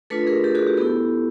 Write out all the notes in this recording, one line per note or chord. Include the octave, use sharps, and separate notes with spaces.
A3 D4 F4 A4 B4
G#4 A#4
G4 A4
F#4 G#4
G4
B3 E4 G4 A4